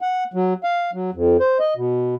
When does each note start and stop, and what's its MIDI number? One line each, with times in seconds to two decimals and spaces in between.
0.01 0.24 78
0.34 0.54 54
0.64 0.91 77
0.93 1.10 54
1.14 1.37 41
1.40 1.58 72
1.59 1.74 75
1.77 2.15 47